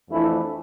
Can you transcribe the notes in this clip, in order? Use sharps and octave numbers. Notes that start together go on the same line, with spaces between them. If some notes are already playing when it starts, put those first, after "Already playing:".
F2 E3 A3 D4 E4